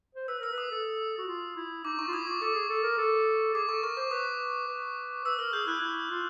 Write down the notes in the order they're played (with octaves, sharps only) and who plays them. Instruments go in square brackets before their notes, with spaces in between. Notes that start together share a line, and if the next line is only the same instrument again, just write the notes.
[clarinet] C5
[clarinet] B4 [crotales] E6
[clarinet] A#4 [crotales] E6
[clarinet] B4
[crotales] D#6
[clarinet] A4
F#4
F4
E4
[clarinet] D#4 [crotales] D6
[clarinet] D#4 [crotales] C#6
[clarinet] F4
[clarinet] E4 [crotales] D#6
[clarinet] F4 [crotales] D6
[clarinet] A4 [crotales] D6
[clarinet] G#4
A4
A#4
A4
[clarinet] G#4 [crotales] D6
[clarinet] A4 [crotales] C#6
[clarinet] A#4 [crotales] C#6
[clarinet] C5 [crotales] D6
[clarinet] B4 [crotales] D#6
[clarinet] B4
[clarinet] B4 [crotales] E6
[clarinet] A#4 [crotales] F6
[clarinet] G#4 [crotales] G6
[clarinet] E4 [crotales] F#6
[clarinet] E4
F4